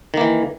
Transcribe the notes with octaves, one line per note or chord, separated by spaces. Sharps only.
D#3 E3 A#3